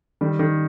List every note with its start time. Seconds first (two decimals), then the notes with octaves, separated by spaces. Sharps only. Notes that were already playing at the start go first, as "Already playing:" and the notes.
0.21 D#3 G3
0.39 D#3